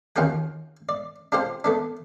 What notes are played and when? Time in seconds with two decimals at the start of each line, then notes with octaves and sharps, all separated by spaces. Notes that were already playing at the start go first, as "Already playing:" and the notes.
0.16 D#2 C#4 F4 F#4 G5
0.89 D5
1.32 D4 F4 G4 C5
1.64 A3 B3 D4